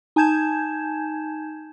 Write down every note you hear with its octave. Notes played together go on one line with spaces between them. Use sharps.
D#4 G#5 A5 G6 G#6 E7